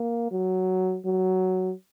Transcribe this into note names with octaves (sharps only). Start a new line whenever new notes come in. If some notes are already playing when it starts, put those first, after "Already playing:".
Already playing: A#3
F#3
F#3